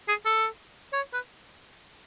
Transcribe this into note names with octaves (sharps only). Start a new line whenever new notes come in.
G#4
A4
C#5
B4